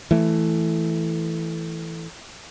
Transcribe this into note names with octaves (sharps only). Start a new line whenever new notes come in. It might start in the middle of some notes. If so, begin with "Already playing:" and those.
E3 A3